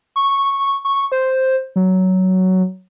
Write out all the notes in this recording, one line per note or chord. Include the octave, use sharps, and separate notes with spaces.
C#6
C#6
C5
F#3